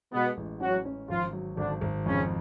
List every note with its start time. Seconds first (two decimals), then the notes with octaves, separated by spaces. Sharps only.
0.12 B2 G#3 B3
0.37 A1
0.60 F#3 C#4 F#4
0.85 C#4
1.09 G#1 F3 F4
1.33 F#3
1.57 G#1 D3 D4
1.81 G#1
2.06 F2 C#3 C#4